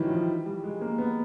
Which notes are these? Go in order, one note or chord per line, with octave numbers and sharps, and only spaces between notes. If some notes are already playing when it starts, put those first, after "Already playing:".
Already playing: D#3 E3 F#3 G3
F3
G3
G#3
A#3
B3